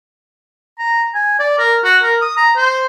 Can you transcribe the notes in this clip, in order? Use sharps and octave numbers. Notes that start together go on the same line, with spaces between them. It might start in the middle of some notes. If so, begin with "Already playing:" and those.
A#5
G#5
D5
A#4
F#4
A#4
D#6
A#5
C5